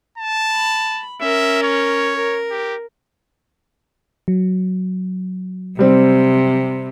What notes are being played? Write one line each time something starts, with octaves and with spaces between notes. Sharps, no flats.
A5
B5
C#4 A#4 E5
C#5
A#4
G4
F#3
C3 G3 C4